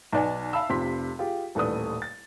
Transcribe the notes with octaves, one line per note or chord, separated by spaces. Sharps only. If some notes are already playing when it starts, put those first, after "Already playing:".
B1 D#4 B4 D5 G#5
E5 F5 A5 B5 E6
F1 C3 F3 C6 B6
F4 G4 G#4
D#1 A1 A3 B4 D5 D#6
A6